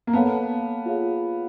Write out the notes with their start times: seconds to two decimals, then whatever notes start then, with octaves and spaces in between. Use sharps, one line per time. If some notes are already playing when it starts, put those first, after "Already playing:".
0.07 A#3
0.13 B3 A4 C#5 F5 A5
0.86 F4 G#4 C#5 F5